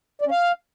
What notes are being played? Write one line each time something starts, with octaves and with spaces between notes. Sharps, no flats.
D5
C#4
F5